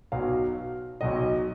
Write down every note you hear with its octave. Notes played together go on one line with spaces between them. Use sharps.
B1 B2 F#3 F5
B1 B2 F#3 D#5